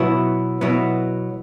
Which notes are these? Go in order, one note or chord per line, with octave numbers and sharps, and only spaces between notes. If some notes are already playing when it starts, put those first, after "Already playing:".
Already playing: B2 F#3 B3 E4
B2 F#3 B3 E4